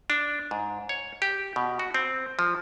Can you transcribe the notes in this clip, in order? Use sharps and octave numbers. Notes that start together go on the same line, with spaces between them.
D4
G#2
C#5
G4
B2
F#4
C4
F3